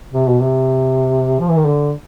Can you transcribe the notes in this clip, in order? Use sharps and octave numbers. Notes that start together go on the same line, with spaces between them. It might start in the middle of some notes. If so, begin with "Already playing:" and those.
C3
B2
C3
F3
E3
D#3
D3